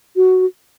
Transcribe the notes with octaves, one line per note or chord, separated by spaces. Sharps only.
F#4